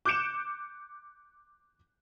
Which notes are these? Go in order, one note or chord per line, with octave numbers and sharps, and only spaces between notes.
D6 F#6 G6 C#7 D7 E7